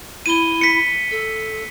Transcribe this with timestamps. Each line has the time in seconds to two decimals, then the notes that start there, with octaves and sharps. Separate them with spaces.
0.26 E4 D#7 G7
0.61 B6 C#7
1.11 A4